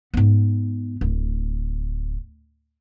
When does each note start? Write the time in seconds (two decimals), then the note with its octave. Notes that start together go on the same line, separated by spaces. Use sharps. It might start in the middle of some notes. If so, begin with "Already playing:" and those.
0.14 G#2 B3
1.01 D1